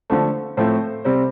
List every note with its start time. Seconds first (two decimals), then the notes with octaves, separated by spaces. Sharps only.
0.10 D3 F3 A3
0.57 A2 F3 A3 C4 A4 C5
1.04 C3 G3 C4